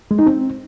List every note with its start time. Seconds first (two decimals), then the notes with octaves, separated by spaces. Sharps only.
0.11 G#3
0.19 D#4
0.27 C4